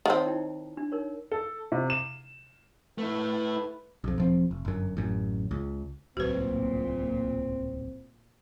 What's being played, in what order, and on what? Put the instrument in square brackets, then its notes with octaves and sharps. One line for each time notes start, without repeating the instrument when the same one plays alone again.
[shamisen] D#3 C4 [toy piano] C#5 A5
[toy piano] D#4 E4 G5
D4
D#4 A#4 C#5
[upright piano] A4
C3
E7
[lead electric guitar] A3 E4 [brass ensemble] B4
[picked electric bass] B1 F2
E1 F3 C4
F1
G1 F#2
A1 F#2
C#2
[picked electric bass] D1 C2 F#3 [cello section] A#2 [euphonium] C4 [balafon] F#4 B4